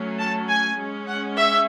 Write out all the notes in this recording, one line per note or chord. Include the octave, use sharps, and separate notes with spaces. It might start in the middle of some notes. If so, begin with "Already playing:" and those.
Already playing: F#3 A3 C#4
A5
G#5
G#3 C#4
F#5
E5